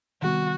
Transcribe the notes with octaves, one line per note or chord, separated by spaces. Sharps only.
C3 D#3 G3 B3 F#4